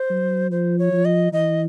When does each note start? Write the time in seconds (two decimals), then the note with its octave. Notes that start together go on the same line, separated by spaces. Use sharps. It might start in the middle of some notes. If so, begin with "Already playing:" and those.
Already playing: C5
0.10 F#3
0.51 F3 C5
0.78 C#5
0.93 F3
1.05 D#5
1.33 E3 D#5